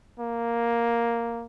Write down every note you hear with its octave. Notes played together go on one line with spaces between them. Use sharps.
A#3